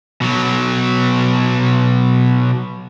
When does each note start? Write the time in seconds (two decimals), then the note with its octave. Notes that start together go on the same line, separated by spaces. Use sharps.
0.21 B2 F#3